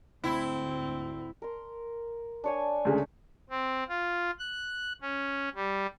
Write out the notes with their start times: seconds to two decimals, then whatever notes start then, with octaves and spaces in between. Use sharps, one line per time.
0.24 D2 G#2 C4 E4
1.42 A#4 C6
2.44 D4 C#5 G#5
2.85 D2 C#3 G#3
3.50 C4
3.89 F4
4.39 F#6
5.02 C#4
5.55 G3